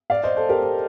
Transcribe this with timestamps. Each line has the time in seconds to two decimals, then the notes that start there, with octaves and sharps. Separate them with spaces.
0.10 D5 F5
0.24 C5 D#5
0.36 A4 C5
0.49 G4 A#4
0.62 G4